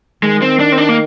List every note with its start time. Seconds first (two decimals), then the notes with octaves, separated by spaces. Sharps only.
0.23 D#3 G#3
0.42 C4
0.59 D4
0.72 C4
0.78 D4
0.89 A#3